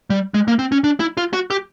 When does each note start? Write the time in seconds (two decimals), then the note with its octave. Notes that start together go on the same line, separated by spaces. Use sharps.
0.10 G3
0.34 G#3
0.48 A#3
0.59 C4
0.72 C#4
0.84 D4
1.00 E4
1.17 F4
1.33 F#4
1.50 G4